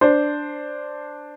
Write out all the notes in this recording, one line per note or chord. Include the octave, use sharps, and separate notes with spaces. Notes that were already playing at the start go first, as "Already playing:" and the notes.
D4 C5